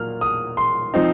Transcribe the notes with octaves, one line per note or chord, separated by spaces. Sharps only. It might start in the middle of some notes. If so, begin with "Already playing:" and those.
Already playing: A#2 F#3 A#3 F6
D#6
C6
F3 C4 D#4